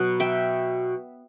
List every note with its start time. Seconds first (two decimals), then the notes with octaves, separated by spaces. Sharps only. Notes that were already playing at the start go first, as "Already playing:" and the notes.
Already playing: B2 F#3 B3
0.20 E5 G5